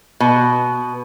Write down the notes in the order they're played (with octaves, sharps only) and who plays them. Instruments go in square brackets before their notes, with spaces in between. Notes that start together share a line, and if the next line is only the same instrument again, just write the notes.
[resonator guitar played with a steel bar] B2